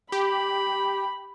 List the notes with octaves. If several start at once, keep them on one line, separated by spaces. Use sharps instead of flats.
G4 B5